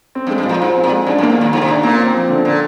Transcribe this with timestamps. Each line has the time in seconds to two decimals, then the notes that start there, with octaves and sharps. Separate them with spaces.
0.15 C4
0.27 G2
0.30 G#3
0.38 G2
0.46 A#2 F3
0.61 G#2 F3
0.76 C4
0.84 A#2
0.92 G#3
1.07 G#2 D4
1.18 G2
1.23 A#3
1.30 G#2
1.38 A#2 D#3
1.53 G#2 D#3
1.62 C3
1.68 A#2 D4
1.83 A#2 A#3
1.98 C4
2.14 F3
2.29 D3
2.45 A#2 D3